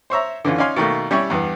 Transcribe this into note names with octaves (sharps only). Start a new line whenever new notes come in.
C5 C#5 E5 A#5
D3 E3 C#4 F4
C#4 D#4 D5 F5 G#5 C6
B2 D#3 A3 A#3
G3 C#4 E4 G4 C#5
E2 G2 B3